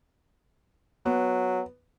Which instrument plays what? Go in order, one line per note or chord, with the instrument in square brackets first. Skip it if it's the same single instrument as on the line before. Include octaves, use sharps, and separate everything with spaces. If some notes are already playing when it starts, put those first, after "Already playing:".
[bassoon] F#3 [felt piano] B3